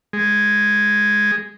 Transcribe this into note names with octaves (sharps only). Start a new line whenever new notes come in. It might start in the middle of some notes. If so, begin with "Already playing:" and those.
G#3